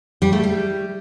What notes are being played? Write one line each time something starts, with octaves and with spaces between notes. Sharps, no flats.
G3
A3
G3